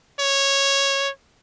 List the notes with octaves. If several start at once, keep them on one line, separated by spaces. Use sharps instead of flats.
C#5